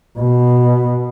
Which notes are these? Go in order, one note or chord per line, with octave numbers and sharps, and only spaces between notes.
B2